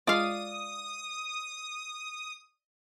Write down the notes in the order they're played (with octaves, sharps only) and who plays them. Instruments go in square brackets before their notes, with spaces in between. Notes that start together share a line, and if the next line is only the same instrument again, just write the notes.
[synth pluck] G#3 F4 [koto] D5 F5 [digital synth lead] D#6